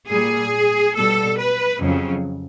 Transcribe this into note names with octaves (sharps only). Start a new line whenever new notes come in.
A#2 G3 G#4
B2 G3 A4
B4
F2 C#3 F#3